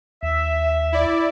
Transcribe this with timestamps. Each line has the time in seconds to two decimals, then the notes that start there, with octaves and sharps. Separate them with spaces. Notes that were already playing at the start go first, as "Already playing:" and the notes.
0.23 D#2 E5
0.92 E4 D5